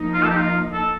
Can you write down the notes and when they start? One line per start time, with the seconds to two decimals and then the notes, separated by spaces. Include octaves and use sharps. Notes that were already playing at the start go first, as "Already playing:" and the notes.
Already playing: F3 A#3 D#4
0.14 F4
0.23 A4
0.30 G4
0.37 F4
0.73 A4